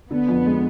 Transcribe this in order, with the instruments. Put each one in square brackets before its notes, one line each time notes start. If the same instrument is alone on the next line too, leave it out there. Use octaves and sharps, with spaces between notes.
[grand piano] D3 [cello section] B3
[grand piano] F2
G#3